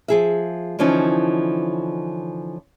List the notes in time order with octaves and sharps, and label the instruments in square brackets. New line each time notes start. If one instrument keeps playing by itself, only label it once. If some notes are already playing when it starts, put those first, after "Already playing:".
[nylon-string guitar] F3 G#4 E5
D3 E3 F3 C#4 D#4